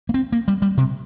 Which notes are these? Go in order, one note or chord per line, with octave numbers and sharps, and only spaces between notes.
A#3
C4
A#3
G3
G3
C3